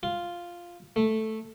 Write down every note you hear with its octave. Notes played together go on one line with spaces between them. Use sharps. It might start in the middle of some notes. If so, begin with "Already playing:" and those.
F4
A3